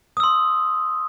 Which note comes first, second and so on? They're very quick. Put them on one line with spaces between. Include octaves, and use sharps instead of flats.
D#6 E6 C6